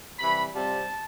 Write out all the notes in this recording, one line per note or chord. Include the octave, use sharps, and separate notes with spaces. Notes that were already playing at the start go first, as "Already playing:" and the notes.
C3 E3 G3 B5
C3 G3 C4 F4 A5